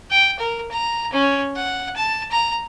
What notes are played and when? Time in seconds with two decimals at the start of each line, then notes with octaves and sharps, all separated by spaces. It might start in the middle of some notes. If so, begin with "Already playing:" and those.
0.11 G5
0.39 A#4
0.71 A#5
1.13 C#4
1.56 F#5
1.96 A5
2.31 A#5